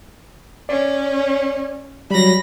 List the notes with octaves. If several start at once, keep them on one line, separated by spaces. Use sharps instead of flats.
C#4 D5
F#3 G3 B5 A#6